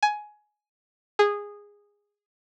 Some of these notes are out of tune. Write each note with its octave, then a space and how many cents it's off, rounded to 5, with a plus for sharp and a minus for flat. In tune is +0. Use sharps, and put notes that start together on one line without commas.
G#5 +15
G#4 -15